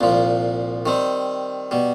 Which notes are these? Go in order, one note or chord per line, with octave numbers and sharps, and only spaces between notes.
C2 A#2 F3
D#3 G3 C4
B2 G3